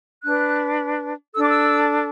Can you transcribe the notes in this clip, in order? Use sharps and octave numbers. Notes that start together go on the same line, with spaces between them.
D4 B4 F#6
D4 A4 E6
D6
E6